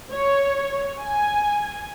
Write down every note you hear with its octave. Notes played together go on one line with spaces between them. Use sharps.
C#5
G#5